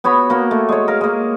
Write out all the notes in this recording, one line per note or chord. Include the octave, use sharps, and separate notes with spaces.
B3 F#4 C#5 B5
A#3 F#4
A3
G#3 C#5
A#4 F5
G#3 A#3